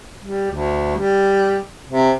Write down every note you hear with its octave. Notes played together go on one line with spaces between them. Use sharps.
G3
D2
G3
C3